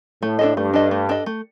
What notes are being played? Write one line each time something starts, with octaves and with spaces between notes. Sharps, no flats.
A2 A3
D4 A4 D#5
G2 A3
D4 A4 D#5
A3
D4 A4 D#5
A3